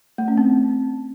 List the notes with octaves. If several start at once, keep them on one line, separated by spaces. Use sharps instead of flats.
A3
C#4
C4